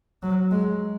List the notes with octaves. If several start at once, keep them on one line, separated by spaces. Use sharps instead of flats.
F#3
G#3